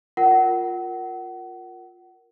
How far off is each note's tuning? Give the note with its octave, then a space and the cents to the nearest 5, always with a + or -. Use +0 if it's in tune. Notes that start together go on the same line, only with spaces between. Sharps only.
F4 +10 A#4 +0 F#5 +30